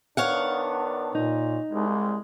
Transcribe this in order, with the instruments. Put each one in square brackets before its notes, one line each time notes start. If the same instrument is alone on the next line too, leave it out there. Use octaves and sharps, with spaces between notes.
[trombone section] D#3 B3 D4 [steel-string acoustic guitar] C#5 F5 F#5
[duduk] A#2 [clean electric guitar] D#4
[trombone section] C2 [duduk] G#3